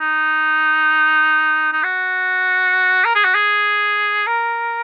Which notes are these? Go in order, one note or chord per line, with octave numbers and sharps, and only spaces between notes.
D#4
D#4
F#4
A#4
G#4
F#4
G#4
A#4